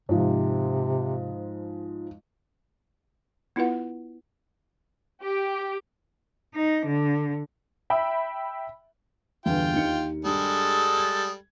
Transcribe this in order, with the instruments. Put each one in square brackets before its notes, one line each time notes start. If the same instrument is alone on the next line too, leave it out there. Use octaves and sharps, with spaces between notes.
[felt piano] G#2 F3 [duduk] C3
[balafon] B3 E4 F4 B4 F#5
[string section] G4
[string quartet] D#4
D3
[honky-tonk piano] E5 G5 B5
[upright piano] G1 E2 [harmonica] F4 G5
[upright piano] D#2 D#3 C#7
[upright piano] G2 [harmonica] G3 G#3 A4 [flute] D#6
[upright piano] G#6